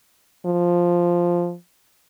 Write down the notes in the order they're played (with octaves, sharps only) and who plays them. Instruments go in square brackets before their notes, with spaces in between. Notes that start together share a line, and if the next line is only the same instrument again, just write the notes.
[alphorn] F3